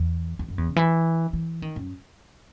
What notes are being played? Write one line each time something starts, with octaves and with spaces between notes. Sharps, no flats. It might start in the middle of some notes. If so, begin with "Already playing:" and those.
Already playing: E2
E2
F#2
E2
C#3
E3
E3
D#3
F#2